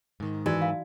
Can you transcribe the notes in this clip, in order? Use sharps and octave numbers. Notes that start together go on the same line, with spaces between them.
G#2 D#3
E3 D#4 F#4 D5
F5